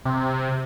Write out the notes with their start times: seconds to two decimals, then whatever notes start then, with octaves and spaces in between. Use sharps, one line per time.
0.05 C3